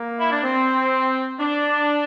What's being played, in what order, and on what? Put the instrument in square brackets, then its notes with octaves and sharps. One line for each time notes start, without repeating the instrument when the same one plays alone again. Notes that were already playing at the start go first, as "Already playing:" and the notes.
Already playing: [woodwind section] A#3
E4
D4
C4
D4